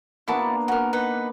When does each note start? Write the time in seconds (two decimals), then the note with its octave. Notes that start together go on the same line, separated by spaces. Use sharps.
0.28 A#3 B3 D4 E4 F#4 A5
0.68 F#4 A#4
0.93 D#4 B4 F#5